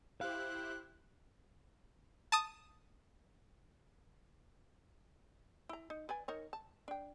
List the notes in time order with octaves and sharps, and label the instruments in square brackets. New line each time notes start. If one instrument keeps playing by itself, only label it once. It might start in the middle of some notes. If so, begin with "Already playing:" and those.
[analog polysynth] E4 G4 C5 [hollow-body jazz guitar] F5 [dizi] F#6
[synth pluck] A5 D#6
[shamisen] E4 A#5
D#4
B4 D5 G#5
D#4 A#4 C#5
A5
D4 G5